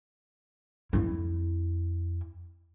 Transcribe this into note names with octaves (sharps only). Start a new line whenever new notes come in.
F2 E4